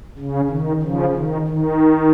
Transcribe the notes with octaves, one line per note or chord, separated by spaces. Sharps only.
C#3
D#3
C#3 F3
D#3
D#3